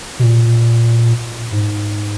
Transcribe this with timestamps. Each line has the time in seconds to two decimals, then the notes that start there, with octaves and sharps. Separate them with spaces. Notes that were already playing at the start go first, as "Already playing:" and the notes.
0.19 B2
0.23 A#2
1.52 G#2